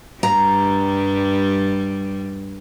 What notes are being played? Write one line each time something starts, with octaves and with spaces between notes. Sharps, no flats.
G2 G3 A#5